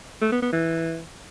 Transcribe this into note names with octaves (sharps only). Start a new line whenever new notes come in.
A3
B3
B3
E3